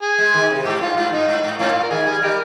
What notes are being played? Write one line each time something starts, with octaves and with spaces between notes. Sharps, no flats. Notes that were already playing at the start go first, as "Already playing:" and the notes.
G#4
G#3
D#3
C3
G#2 G4
G2 F4
G#2 F4
G2 D#4
G#2
G#2
G#2 A#3 C#4 F4
A#2
A#4
D#3 G#4
G3 G#4
G3 D#4 G4 A#4